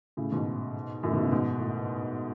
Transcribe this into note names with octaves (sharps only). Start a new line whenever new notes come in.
A2 C#3
G#2 B2
F#2 A2
G#2 B2
A2 C#3
G#2 B2
A2